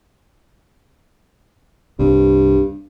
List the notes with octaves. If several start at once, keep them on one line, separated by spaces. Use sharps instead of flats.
C2 G2 C4